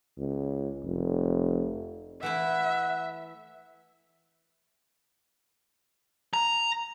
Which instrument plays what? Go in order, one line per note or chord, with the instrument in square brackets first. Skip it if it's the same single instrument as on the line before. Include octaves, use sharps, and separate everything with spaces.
[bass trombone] C#2
F1
[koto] E3 A3 E4 [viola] E5 [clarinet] F#5
[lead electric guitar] A#5